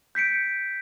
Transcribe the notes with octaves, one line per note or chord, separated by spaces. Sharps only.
G6 B6 C#7 D7